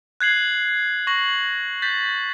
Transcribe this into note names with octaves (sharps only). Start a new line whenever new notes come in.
F#6 G#6 C7 F#7
C#6 A#6 F#7
G6 A6 B6